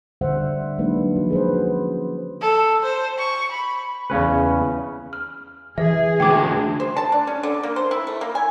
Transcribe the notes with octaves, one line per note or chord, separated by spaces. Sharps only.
D3 G3 C5 E5 F#5
F#3 G#3 A#3 D4 D#4 B4
F3 F#4
G#4 B4 C5
C#4 F#4
A4
C5
C#6
B5
E2 C#3 C#4 B4
F6
E3 G#4 E5
D2 G#3 G5 D6
C5
A5
D4
C#4
D3
A#3
C5
E4
A3
A#3
G#5